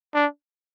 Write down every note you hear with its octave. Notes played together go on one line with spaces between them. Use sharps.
D4